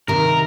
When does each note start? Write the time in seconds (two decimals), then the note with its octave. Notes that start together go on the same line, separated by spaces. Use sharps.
0.08 C3 D#3 A#4